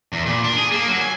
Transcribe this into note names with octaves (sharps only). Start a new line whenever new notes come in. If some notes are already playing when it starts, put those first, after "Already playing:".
E2
A#2
D4
G#4
A#3
F#3
G#5